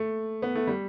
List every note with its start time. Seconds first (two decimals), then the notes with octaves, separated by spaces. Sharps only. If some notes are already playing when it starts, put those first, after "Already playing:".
Already playing: A3
0.42 B3
0.55 A3
0.67 G3